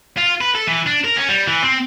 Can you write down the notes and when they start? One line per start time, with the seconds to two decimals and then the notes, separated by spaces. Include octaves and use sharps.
0.17 F4
0.41 B4
0.55 A4
0.67 E3
0.86 D4
1.04 A#4
1.17 C#4
1.29 G3
1.48 E3
1.63 C4